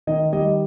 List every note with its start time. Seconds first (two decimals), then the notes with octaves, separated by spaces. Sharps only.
0.07 D#3 D#5
0.32 G3 D#5